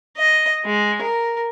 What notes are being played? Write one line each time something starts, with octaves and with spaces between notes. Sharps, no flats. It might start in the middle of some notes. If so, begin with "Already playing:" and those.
D#5
G#3
A#4